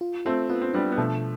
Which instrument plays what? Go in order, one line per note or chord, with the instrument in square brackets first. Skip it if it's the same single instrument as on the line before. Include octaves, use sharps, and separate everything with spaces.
[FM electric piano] F4
[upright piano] A3 C4 [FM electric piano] F4
[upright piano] B3 [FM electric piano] F4
[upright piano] C4
[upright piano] G3 B3 [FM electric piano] D4
[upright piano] B3
[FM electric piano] B2 [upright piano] F3 A3